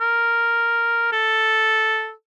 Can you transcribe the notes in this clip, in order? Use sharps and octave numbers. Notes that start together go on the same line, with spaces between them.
A#4
A4